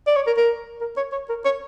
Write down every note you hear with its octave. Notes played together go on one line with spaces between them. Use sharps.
D5
C#5
A#4
A#4
A#4
C#5
C#5
A#4
C#5